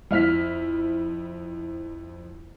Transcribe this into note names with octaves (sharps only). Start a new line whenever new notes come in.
F2 E4 F6 B6